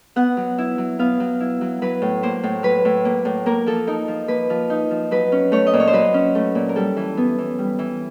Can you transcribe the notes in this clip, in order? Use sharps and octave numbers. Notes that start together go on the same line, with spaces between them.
B3 F#5
F#3
E4
F#3
B3 F5
F#3
E4
F#3
F#3 B4
A2
A#3 C5
A2
F#3 B4
A2
A#3
A2
A#3 A#4
F3 A4
D#4 A#4
F3
A#3 B4
F3
D#4
F3
F#3 B4
C#4
A3 C#5
D#5
A#2
C#5
C5
F#3 B4
C#4
A3
A#2
A#4
G3 A4
E3
B3
E3
G3
E3